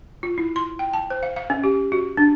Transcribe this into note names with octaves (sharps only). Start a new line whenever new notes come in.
F4
E4
C6
G5
A5
C5
F5
F5
C#4
G4
F#4
D4